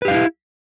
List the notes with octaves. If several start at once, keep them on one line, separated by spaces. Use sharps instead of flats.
D#4 E4 G4 B4 F5